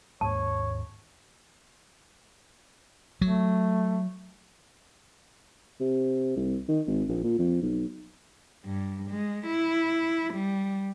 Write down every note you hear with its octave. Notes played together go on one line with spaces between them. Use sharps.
D#2 G#2 G#3 C#5 A5
F#3 A3
C3
C2
D#3
G#1
A#1
A#2
F2
B1
G2
G#3
E4
G3